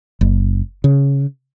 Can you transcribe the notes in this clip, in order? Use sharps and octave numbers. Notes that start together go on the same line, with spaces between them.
F#1
C#3